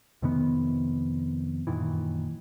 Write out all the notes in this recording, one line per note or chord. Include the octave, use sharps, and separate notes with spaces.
F2 C3 D#3 B3
F#2 A#2 D#3 E3